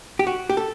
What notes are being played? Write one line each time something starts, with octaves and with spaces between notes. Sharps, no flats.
G4
F#4
G4
A4